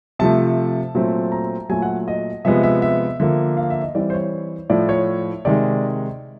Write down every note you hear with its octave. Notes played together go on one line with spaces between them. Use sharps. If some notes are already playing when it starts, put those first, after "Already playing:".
C3 F3 A3 A5
A#2 F#3 A3 C4
A#5
A#2 F#3 A3 G#5
F#5
D#5
C3 F3 G#3 B3 E5
E5
E5
D3 F3 A#3 E5
F5
E5
D#5
E3 G3 C4 D5
C5
C#5
A2 F3 A3 D5
C#5
C3 D#3 G#3 D5